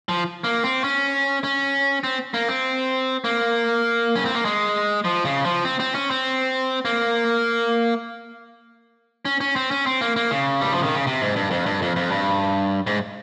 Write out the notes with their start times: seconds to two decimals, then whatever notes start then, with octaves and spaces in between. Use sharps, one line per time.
0.09 F3
0.44 A#3
0.64 C4
0.84 C#4
1.44 C#4
2.04 C4
2.34 A#3
2.48 C4
3.24 A#3
4.16 C#4
4.25 C4
4.35 A#3
4.45 G#3
5.05 F3
5.25 C#3
5.45 F3
5.65 C4
5.80 C4
5.95 C#4
6.10 C4
6.85 A#3
9.25 C#4
9.40 C#4
9.56 C4
9.71 C#4
9.86 C4
10.01 A#3
10.16 A#3
10.31 C#3
10.61 G3
10.72 F3
10.83 D#3
10.95 C#3
11.07 C3
11.21 G#2
11.36 G2
11.51 F2
11.66 G2
11.82 F2
11.96 F2
12.11 G2
12.87 G#2